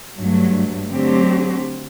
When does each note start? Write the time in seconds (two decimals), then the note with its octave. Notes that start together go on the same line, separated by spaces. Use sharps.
0.18 G2 F#3 A3
0.91 D3 F#3 A3 C4 G4